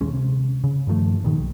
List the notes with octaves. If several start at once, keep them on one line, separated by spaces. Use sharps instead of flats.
D#1 D#2 G#3 C#4
C3
C#3
G2 D#3 F3 A3
A#2 D#3 F#3 A3
B1